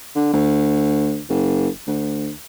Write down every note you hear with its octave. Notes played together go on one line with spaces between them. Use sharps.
D3
D2
F#1
D2